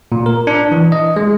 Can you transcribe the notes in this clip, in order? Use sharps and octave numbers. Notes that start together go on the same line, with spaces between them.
A#2
A#4
D4
E3
D#5
G#3